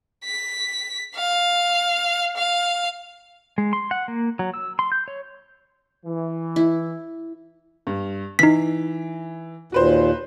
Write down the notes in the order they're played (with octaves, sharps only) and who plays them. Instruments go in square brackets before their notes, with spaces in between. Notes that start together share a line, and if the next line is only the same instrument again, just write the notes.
[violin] B6
F5
F5
[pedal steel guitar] G#3
C6
F#5
A#3
F#3
E6
C6
G6
C#5
[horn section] E3
[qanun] E4
[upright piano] G2
[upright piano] E3 [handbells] D#4 B6
[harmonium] D#2 A#2 [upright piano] F#4 B4 C5